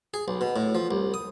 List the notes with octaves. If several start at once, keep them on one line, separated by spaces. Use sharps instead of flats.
G#4
B1
B2
A2
F3
C2
D#6